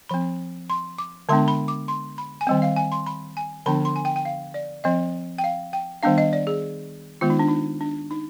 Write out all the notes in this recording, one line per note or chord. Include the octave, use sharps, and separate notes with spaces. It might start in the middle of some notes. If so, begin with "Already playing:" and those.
F3 C4 B5
C6
D6
D3 G#3 B3 D4 C6
B5
D6
C6
B5
G#5
D#3 G3 C4 G5
F5
G#5
C6
B5
G#5
D3 F3 B3 D4 B5
C6
G#5
G5
G5
F5
D5
F3 C4 D#5
G5
F5
G5
D#3 G3 B3 D4 F5
D#5
D5
G#4
D#3 G#3 B3 F4
D#4
D4
D#4
D4
D#4